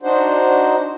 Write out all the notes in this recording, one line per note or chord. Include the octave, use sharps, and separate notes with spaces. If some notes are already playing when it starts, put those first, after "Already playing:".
D4 D#4 F#4 C5